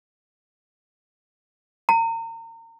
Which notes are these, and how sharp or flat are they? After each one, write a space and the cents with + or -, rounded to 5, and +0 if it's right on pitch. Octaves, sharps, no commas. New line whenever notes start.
A#5 -35